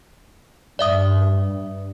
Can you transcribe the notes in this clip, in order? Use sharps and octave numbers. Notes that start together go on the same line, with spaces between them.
G2 D5 E5 D#6